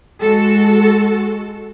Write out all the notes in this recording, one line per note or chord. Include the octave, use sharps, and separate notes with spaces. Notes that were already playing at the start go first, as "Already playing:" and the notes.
G#3 F#4 A4